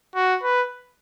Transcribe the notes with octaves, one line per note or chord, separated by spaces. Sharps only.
F#4
B4